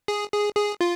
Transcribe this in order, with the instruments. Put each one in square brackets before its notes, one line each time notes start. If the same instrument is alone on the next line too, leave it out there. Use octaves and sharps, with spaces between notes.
[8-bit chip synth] G#4
G#4
G#4
F4